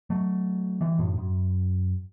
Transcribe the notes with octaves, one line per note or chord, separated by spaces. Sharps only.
F#3 A3
E3 G3
F#2 A2
F#2